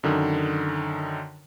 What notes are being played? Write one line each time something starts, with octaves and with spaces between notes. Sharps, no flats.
F#2 D3 D#3